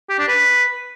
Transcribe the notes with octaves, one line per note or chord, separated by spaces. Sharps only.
G4
D4
B4